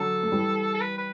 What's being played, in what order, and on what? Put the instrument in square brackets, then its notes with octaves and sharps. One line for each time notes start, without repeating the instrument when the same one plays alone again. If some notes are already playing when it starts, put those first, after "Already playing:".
Already playing: [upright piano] D3 F#3 [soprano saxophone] A4
[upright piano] A3
E3 G3
[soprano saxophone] A4
B4
B4